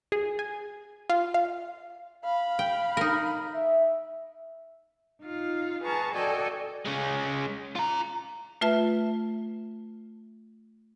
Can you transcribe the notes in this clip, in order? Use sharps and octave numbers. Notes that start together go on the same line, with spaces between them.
G#4
G#5
F4
F5
F5 B5
G5
D#4 A#4
E5
D#4 F4 F5
G#4 B4 A5 A#5 C#6
F#4 A4 D5 D#5 G5 G#5
G#3 C#4
F4 A#5
A3 F4 B4 E5 A5